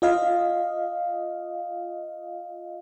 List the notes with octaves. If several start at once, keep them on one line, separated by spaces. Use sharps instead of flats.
F4 D#5 F5